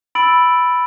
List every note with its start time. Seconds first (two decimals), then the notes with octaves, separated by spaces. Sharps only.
0.15 B5 E6 A6 D7 F#7